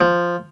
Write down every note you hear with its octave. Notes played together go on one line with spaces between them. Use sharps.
F3